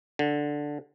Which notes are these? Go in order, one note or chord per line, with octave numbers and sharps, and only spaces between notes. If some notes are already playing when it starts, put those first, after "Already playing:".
D3